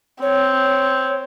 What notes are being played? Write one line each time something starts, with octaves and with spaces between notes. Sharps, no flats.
C4 C#5